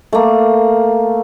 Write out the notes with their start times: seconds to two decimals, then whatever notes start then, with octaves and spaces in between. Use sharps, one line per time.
0.13 A3 A#3